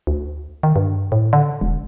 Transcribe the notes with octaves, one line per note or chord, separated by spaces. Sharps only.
D2
D#3
G2
A2
D3
E1